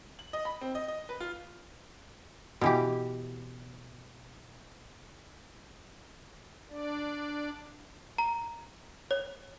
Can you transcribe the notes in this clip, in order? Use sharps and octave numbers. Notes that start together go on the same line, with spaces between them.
F#7
D#5
B5
C4
D#5
D#5
B4
F4
B2 E3 G4
D4 D5
A#5
C#5